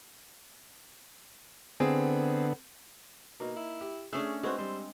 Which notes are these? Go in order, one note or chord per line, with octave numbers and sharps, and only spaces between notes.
D3 B3 C4 G#4
B2 A#3 D#4
E4
G4
A3 C#4 D4 G#4 E6
G#3 C4 F#4 G#4 B4 C5
G3 C5